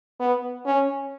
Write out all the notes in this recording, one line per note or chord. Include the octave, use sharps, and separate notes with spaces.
B3
C#4